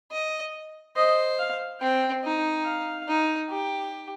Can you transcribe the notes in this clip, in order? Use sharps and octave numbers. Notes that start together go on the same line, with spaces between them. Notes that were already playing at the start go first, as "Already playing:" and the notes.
D#5
C5 D#5
F5
C4 G5
D#4
F5
D#4
G4